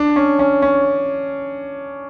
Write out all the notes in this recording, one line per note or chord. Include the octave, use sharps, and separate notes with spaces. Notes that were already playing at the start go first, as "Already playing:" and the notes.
Already playing: D4
C#4
C#4
C#4